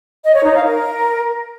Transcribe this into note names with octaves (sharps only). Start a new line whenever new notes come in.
D#5
C#5
D#4
F5
A#4